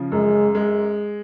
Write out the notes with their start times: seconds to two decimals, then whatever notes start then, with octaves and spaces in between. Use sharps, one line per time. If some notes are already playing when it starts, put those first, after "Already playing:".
Already playing: C#3 F3
0.12 F#2 G#3
0.55 G#3